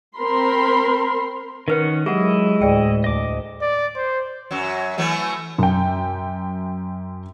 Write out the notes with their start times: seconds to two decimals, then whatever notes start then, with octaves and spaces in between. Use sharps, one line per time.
0.16 C4 A#4 B5 C6
1.68 D#3 C#4 A#4 B4 F#5
2.06 F#3 G#3 E4 G4 D#5 F#5
2.62 D2 A2 G#4 D5 G5
3.04 D2 D#5 D6
3.62 D5
3.96 C5
4.51 F#2 F#3
4.98 E3 F#3 A3
5.58 F#2 G5